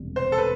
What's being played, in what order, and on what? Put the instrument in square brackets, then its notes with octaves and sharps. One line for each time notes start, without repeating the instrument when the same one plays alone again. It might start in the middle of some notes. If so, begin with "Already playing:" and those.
Already playing: [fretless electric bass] E1 D2 C3 G3
[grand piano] C5
A4
B4